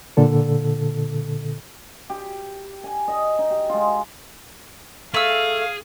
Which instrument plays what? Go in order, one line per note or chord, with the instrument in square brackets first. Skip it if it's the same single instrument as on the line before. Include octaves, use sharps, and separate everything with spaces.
[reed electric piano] A#2 D3 A4
[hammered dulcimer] G4
G#5
D#5
D#4
G4
G#3 F4
[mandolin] A3 E6 [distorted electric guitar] G#4 [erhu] F5